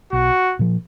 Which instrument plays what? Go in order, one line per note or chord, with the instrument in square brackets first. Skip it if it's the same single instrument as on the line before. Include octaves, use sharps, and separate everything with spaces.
[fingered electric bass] B1 [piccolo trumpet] F#4
[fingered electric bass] A#2 F3